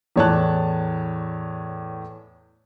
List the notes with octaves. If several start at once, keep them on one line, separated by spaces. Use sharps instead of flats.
E2 A2 C#5 D5 A5 F#6